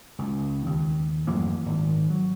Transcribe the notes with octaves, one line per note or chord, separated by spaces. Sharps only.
C#2
D#2
A1 F#2 E3 A#3
G#1
F#3